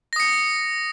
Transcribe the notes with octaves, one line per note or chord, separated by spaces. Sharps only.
D#6 A#6 C#7